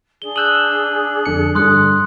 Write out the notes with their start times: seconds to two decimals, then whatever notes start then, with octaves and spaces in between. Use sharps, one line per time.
0.22 D4 G#4 D5 G7
0.36 D#6 E6 F#6 G6 F#7
1.25 F2 D3 C#7
1.55 G2 D3 C6 D#6 F#6